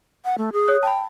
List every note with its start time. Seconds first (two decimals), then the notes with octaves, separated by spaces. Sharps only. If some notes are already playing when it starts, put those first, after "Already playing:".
0.25 F#5
0.38 A3
0.53 G#4
0.68 C#5 D#6 F#6
0.83 G5 A5 B5